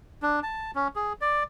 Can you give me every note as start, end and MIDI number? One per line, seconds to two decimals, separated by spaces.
0.23 0.40 62
0.43 0.71 81
0.75 0.88 61
0.96 1.13 68
1.21 1.43 74